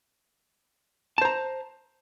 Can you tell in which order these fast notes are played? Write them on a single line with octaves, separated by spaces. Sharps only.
A5 C5 A#5